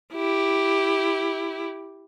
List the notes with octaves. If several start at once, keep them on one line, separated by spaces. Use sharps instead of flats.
E4 G4